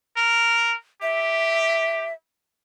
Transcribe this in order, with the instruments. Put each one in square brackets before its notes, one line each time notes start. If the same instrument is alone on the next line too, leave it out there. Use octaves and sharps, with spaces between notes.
[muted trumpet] A#4
[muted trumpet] G4 [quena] E5